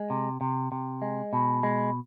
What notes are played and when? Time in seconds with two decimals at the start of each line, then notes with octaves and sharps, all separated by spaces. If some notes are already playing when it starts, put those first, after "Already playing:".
Already playing: G#3
0.10 C3
0.41 C3
0.72 C3
1.02 G#3
1.33 B2
1.63 G#3